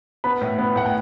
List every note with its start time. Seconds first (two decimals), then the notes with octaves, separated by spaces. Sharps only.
0.24 B3 B5
0.41 A2
0.58 B3
0.76 A2 F#5
0.86 G5